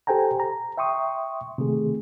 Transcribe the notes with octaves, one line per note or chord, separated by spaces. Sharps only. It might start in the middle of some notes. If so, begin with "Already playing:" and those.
G4 A4 C5 G5 G#5 A#5
A#5
E5 G5 C6 C#6 D#6
C3 D#3 A3 G#4